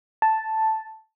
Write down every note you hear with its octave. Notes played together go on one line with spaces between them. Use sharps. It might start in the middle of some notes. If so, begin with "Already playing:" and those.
A5